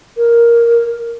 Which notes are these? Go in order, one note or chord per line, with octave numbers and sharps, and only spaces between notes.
A#4